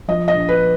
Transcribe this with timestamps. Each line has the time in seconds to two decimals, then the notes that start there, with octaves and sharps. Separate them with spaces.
0.08 F3 D#5
0.28 D#5
0.35 A#1
0.49 B4